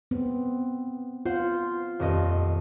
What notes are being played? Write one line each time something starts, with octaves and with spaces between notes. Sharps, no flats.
B3 C4
F4 C5 F#5
D#1 F2 D#5